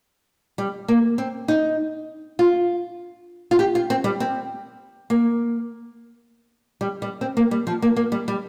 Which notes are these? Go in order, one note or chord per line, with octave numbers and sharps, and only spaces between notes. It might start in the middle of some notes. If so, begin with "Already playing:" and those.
G3
A#3
C4
D#4
F4
F4
G4
F4
C4
G3
C4
A#3
G3
G3
C4
A#3
G3
F3
A#3
A#3
G3
G3